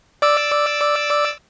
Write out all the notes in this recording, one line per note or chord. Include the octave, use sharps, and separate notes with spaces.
D5 D6 E6